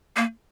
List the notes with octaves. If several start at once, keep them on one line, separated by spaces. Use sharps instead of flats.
A#3